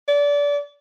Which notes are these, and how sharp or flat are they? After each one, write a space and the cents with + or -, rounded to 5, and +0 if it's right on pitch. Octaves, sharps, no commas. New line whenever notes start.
D5 -25